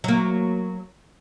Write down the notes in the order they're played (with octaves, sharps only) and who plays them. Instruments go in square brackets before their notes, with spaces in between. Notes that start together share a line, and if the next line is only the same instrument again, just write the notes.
[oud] F#3 A#3